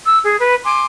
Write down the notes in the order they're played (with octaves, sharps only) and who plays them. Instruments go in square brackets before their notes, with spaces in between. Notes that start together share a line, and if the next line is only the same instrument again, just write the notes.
[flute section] E6
G#4
B4
G#5 C6 D6